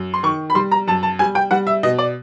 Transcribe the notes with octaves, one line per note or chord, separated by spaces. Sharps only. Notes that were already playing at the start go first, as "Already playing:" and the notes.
Already playing: F#2
C6
D#3 C#6
B5
G3 C6
A#5
F#2 A5
A5
G3 G#5
G5
G3 F#5
E5
B2 D#5
D5